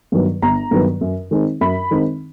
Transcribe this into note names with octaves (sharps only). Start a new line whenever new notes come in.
G2 D#3 F#3 B3
G1 A#5
G2 D#3 F#3 B3
F#2
D#3 G#3 C4 D#4
F#2 B5
D#3 G#3 C4 D#4